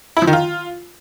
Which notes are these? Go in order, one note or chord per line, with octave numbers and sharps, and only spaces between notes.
E4
F3
D#3
F4